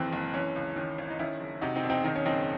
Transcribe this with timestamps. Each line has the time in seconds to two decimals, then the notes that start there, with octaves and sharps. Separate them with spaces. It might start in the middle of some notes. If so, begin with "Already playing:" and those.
Already playing: F#1 D#3 E3 C4
0.12 F#1
0.34 E3 C#4
0.56 C#2
0.76 D#3 C#4
0.98 G#1
1.10 D#4
1.19 D#3 C#4 E4
1.40 F#1
1.61 C3 D#4 F#4
1.76 C4 D#4
1.83 E1
1.90 C4 D#4
2.04 D#3 D#4
2.16 C#4
2.25 F#1 C4 D#4